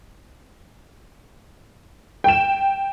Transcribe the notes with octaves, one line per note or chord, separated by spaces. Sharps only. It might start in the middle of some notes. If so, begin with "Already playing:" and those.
G5 E7